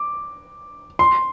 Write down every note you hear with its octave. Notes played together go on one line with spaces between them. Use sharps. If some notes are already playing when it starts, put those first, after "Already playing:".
Already playing: D6
C6